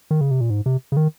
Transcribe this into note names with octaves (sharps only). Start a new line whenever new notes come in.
D#3
C#3
C3
A#2
G#2
C3
C#3
D#3